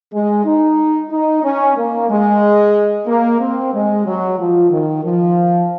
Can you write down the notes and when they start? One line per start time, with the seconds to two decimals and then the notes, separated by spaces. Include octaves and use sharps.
0.13 G#3
0.45 D#4
1.10 D#4
1.43 C#4
1.76 A#3
2.09 G#3
3.06 A#3
3.40 C4
3.72 G#3
4.05 F#3
4.38 F3
4.70 D#3
5.03 F3